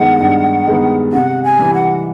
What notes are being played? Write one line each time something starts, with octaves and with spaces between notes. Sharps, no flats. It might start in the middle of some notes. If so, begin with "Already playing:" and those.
Already playing: G2 D#3 G#3 B3 F#5
G2
D#3 G#3 B3
C3 F#5
G#5
E3 G3
F#5